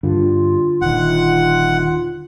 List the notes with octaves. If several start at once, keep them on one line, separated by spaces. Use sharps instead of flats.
G2 D3 F4
D#1 D#3 F#5